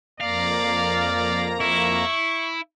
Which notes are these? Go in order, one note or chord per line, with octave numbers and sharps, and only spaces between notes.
F2 A#3 D5 F5 A#5
E4 C#6